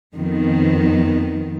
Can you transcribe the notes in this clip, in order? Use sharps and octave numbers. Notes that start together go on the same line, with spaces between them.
F2 D#3 B3